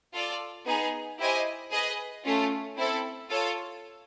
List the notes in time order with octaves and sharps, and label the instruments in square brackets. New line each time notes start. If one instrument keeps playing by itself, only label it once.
[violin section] F4 A4 D5
B3 D#4 G#4
E4 G4 C5 D#5 G#5
G#4 B4 D#5
A3 C#4 F4
C4 E4 A4
F4 A4 C#5